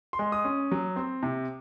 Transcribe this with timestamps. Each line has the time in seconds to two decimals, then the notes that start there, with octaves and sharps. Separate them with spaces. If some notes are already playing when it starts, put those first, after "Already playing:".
0.13 C6
0.19 G#3
0.32 D#6
0.45 C#4
0.72 F#3
0.96 C4
1.23 C3